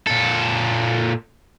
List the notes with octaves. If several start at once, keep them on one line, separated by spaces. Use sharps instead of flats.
A#2 A4